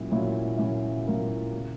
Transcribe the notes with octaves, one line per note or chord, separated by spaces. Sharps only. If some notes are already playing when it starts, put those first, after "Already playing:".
Already playing: A#2 F#3 A#3 C#4 E4
A#2 F#3 A#3 C#4 E4
A#2 F#3 A#3 C#4 E4
A#2 F#3 A#3 C#4 E4
C#3